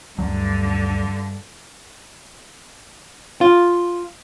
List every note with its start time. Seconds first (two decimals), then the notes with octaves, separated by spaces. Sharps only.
0.19 D2 G2 D3 F#3
3.41 F4